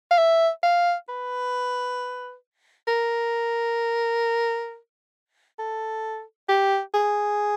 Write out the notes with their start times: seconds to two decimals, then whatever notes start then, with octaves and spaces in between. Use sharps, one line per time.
0.11 F5
0.18 E5
0.63 F5
1.09 B4
2.88 A#4
5.59 A4
6.49 G4
6.94 G#4